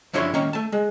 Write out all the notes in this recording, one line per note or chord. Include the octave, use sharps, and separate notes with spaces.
F#2 D3 F3 E4 C#5 C6
D#3 A#3 C#4
A3 A5
G#3